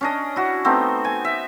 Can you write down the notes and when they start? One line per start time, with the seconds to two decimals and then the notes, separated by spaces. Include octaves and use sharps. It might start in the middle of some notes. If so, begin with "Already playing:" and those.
0.01 C#4 D4 D#5
0.36 E4 F#4
0.65 A3 B3 C4 D#4
1.05 G#5
1.25 E5